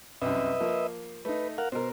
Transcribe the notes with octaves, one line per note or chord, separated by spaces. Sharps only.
C2 F#2 B4 D#5 E5
F3 A#3
A3 D#4 B4
A#4 F5 F#5
B2 A#4 C5